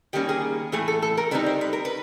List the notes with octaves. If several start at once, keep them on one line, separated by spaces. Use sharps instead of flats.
D#3 G3 A#3 C#4 G4
G#4
A2 E3 A3 G#4
A4
A4
A#4
D3 G3 C4 D#4 B4
C5
B4
A#4
B4